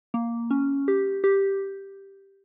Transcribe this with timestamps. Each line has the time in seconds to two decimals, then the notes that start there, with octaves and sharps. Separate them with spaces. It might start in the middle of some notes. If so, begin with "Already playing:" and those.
0.14 A#3
0.51 C#4
0.88 G4
1.24 G4